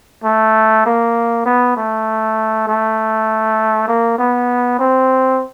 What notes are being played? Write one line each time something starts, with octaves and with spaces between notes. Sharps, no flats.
A3
A#3
B3
A3
A3
A#3
B3
C4